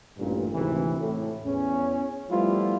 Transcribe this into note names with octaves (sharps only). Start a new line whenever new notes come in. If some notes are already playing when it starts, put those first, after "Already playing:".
A1 G2 A#2
G#1 D2 C3 E3
A2
E2 C#4
F3 G3 A3 B3 E4 F4